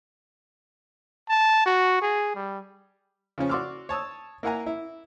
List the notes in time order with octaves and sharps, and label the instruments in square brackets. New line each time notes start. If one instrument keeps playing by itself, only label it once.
[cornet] A5
F#4
G#4
G3
[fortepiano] C#3 F3 C#4
F#4 D5 C6 D6 E6 F6
C#5 A5 D#6 E6
A#3 E4 A#4 F#5 G#5 A#5
E4